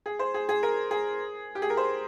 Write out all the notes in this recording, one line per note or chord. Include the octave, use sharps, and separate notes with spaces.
G#4
C5
G#4
G#4
A#4
G#4
G4
G#4
A#4
C5